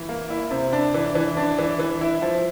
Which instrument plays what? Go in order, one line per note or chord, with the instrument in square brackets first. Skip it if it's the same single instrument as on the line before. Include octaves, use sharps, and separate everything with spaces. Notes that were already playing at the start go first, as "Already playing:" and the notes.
Already playing: [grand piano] E3
A#3
E4
C3
D4
E3
E3
D4
E3
E3
E4
F3